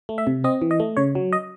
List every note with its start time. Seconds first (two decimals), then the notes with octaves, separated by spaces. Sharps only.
0.09 A3
0.18 E5
0.27 C3
0.44 C4 D#5
0.62 E3
0.71 D#5
0.80 A3
0.97 C#3 C#5
1.15 F#3
1.33 D#5